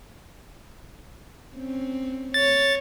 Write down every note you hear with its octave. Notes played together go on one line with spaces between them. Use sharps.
C4 C#4
C#5 A6